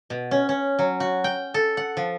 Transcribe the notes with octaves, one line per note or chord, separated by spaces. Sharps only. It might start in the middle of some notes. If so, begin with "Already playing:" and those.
B2
C#4
C#4
F#3
F#4
G5
A4
F#5
F3